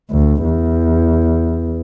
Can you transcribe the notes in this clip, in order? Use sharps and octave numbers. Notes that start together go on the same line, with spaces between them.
D2
E2